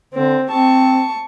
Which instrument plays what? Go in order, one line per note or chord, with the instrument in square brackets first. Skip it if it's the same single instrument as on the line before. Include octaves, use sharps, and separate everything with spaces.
[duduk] D3 [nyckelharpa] C4
[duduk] C4 [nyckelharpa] A5 C#6